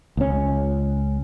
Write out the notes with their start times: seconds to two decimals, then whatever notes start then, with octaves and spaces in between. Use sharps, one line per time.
0.17 C#2 C#4